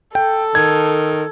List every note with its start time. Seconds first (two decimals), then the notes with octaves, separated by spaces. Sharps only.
0.15 A4 G5
0.55 D#3 G#6